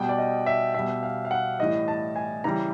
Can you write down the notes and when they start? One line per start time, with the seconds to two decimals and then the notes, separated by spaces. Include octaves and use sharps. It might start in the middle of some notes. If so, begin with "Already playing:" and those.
Already playing: B2 G3 G5
0.09 D5
0.18 D#5
0.46 E5
0.74 B2 G3 E5
1.03 F5
1.25 F5
1.31 F#5
1.59 A2 E3 G3 D#5
1.88 A5
2.16 G#5
2.44 C#3 E3 G3 A#5